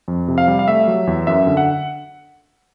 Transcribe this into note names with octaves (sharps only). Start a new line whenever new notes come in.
F2
C3
F5
G3
F5
A3 E5
F#3
E2
F#2 E5
D3
F#5